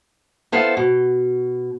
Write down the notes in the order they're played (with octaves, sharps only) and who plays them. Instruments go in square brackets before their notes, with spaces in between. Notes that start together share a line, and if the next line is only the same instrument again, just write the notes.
[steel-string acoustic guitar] B3 E4 A4 C5 F5
B2